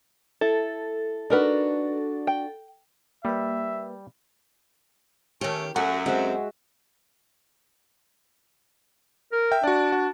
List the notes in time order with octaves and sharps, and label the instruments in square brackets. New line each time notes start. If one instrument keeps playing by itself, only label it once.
[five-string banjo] E4 [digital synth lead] A4
[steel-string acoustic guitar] D4 F#4 [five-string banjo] D#4 A#4 B4
[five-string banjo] G5
[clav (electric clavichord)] G3 [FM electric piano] A#3 B4 [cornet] E5
[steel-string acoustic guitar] D#3 G4 [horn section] A3 C#4
[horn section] F#2 A3 [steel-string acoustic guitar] F#4 [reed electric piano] F#5
[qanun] G#3 F#4 E5 [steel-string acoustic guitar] C4
[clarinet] A#4
[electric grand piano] E5 G5
[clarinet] D4 [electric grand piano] F#4 D5
[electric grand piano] F#4